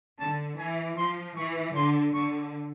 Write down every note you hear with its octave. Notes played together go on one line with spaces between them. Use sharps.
D3 A5
E3 G#5
F3 C6
E3 C#6
D3 C6
D3 C#6